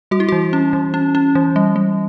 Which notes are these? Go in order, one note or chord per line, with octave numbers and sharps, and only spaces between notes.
G3 F#4
E4
E3 F#4
C#4
E3
C#4
C#4
E3
G3
G3